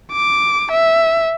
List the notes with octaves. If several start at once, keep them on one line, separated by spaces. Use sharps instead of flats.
D6
E5